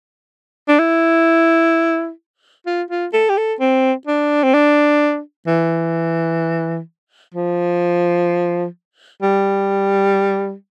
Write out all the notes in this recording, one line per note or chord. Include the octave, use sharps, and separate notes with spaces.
D4
E4
F4
F4
A4
G4
A4
C4
D4
C4
D4
E3
F3
G3